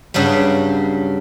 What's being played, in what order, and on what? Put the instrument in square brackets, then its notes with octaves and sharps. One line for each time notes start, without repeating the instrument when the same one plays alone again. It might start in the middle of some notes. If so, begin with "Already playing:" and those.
[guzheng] G2 C#3 F#3 G3